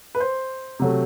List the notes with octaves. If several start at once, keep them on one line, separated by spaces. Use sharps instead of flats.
B4
C5
C3 F#3 A3